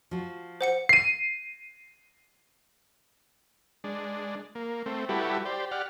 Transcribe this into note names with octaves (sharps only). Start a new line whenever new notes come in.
F3 F#4
C5 F#5 C#7
C7 D#7
G#3 D4
A#3
A3 C4
G3 E4 F#4 G4 A4 B4
G4 C5 D5
G4 D5 F#5 F6